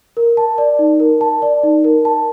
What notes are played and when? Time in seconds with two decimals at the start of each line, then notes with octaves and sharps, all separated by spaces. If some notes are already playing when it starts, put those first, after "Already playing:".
0.17 A#4
0.37 A5
0.58 D5
0.79 D#4
1.00 A#4
1.21 A5
1.42 D5
1.63 D#4
1.84 A#4
2.05 A5